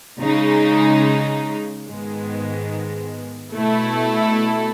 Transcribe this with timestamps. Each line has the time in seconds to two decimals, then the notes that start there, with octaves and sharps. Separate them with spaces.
0.21 C#3 G#3 D#4
1.87 G#2 D#3 G#3 B3
3.55 B2 A3 E4 A4